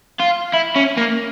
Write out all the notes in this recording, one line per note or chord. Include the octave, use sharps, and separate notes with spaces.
F4
E4
C#4
A#3